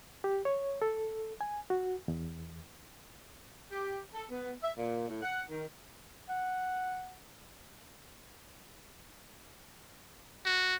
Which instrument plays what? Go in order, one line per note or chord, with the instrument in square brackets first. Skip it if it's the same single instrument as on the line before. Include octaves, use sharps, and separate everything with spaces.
[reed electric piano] G4
C#5
A4
G#5
F#4
E2
[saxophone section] G4
A4
B3
E5
A#2
A2
F#5
D#3
[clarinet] F#5
[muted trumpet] F#4